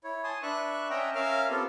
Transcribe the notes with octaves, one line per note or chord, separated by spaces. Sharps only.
E4 C#5
G#5 A5 C6 D#6
D4 B4 E5 C#6 F#6
C#4 D#5 E5 F#5 G5 A#5
C#4 A#4 E5 F5 F6
B3 C4 F4 G4 A4